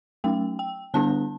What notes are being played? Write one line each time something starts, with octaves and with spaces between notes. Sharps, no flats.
F#3 A3 C#4 G5
G5
D3 G3 B3 D4 A5